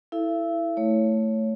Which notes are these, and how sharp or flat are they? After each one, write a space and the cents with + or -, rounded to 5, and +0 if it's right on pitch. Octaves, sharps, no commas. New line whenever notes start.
E4 -10 A4 +5 E5 +45
A3 +0 C#5 +0